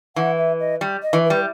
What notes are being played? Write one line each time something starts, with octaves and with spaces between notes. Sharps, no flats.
E3 F#5
E5
D#5
G3
D#5
E3
B4
G3